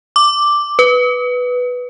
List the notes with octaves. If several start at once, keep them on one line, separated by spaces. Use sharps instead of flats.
D6
B4